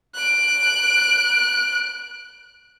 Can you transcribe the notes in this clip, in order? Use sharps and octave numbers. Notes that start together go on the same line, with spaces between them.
F#6 D7